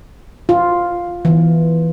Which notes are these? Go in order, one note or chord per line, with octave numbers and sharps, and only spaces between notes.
F4
E3